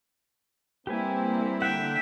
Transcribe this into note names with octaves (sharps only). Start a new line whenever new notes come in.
G3 A#3 C4 E4 G4 B4 G#5
D3 E5 F#5 G5